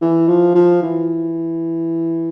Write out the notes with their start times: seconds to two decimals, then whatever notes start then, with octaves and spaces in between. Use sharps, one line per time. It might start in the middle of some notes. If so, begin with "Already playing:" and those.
0.01 E3
0.28 F3
0.55 F3
0.83 E3